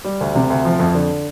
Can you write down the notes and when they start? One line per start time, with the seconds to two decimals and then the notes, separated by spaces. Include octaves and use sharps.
0.04 G3
0.21 D2
0.35 C3
0.50 D2
0.65 F3
0.79 F2
0.95 D3